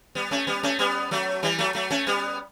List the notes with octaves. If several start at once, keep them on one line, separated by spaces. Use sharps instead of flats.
G3 B3
A3 C#4
G3 B3
A3 C#4
G3 B3
F#3 A3
E3 G3
F#3 A3
F#3 A3
A3 C#4
G3 B3